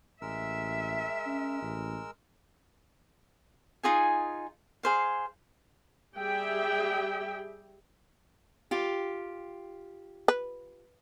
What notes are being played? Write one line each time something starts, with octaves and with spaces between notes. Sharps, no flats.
A1 G#3 A#4 E5 E6
C#4
A1
D#4 F4 G#4 G#5
G#4 C5 F5
G3 G4 G#4 E5 G5
F4 G4
B4